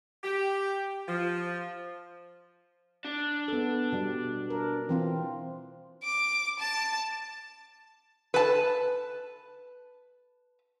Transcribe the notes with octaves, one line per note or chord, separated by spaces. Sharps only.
G4
F3
D4
B3 A4
B2 G3
A#4
E3 C4 F4
D6
A5
B4 A5